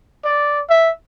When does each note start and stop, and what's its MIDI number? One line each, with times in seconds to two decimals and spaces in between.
0.24 0.60 74
0.69 0.91 76